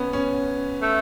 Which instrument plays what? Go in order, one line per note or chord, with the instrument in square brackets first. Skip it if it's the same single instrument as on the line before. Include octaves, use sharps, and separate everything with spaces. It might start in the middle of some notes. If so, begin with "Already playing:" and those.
Already playing: [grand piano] B3 C#4
C#4
[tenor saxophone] A3